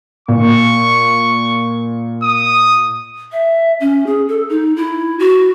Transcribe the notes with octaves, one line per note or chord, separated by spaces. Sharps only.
A#2 C#6
D#6
E5
C#4
G#4
A4
D#4
E4
F#4